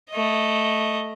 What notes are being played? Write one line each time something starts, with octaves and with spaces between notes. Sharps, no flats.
A3 D#5